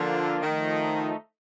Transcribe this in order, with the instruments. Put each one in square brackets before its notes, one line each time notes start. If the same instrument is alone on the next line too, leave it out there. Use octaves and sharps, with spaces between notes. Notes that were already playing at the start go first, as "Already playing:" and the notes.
Already playing: [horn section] D3 [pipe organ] F3 A#3 D4 F4
[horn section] D#3 [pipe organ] F3 A3 D#4